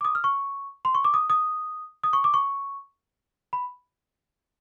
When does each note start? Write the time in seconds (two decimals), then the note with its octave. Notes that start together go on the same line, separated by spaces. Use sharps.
0.01 D6
0.05 D#6
0.15 F6
0.24 C#6
0.85 C6
0.95 C#6
1.04 D6
1.14 D#6
1.30 D#6
2.04 D#6
2.13 C#6
2.24 D6
2.34 C#6
3.53 B5